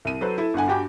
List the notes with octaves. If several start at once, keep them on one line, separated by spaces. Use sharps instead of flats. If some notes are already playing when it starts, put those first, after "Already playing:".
C2 D#7
F#3 A4 B4 C5
E4 A4
G1 G2 F#5 G#5
G2 F#4 G4 G5 G#5 D6